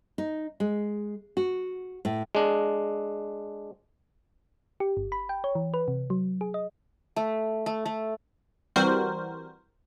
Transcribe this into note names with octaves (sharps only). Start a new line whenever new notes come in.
D#4
G#3
F#4
A2
G#3 D4
G4
G1
B5
G5
C#5
E3
B4
C3
F#3
G#4
D#5
A3
A3
A3
E3 G3 C4 F#4 A#4 C5